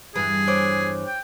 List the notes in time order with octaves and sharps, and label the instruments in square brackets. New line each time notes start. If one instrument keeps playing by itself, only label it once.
[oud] E2 G2 E3 [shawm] G#4
[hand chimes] C5 C#5 D6
[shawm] G5